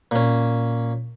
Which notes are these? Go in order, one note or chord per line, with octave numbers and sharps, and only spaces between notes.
A#2 C#4